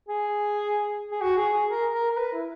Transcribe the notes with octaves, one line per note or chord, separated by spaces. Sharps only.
G#4
G#4
F#4
G#4
G#4
A#4
A#4
A#4
B4
E4